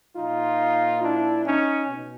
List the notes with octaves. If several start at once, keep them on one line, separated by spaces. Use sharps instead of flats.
A#2 F3 D#4 F4
D4 E4
C#4 D#4
B2